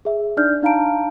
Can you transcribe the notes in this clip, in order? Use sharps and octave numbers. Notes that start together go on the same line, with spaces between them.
G#4 E5
D4 D#4 D5 F6 G6
D4 D#4 F5 A5 A#5 D7